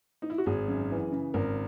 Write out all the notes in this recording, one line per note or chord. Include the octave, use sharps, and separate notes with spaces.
D#4
E4
F#4
G#1 G#4
F#2
E3
C#3
G#1 A#4